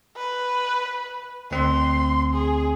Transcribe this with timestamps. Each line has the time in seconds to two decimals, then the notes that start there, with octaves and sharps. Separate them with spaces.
0.16 B4
1.51 D2 C4 C6
2.34 G#4